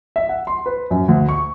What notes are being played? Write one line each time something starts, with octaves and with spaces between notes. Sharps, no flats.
E5
F#5
C6
B4
F#2
D2
C#6